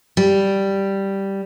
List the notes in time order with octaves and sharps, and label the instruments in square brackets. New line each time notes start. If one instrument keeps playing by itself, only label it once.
[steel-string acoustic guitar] G3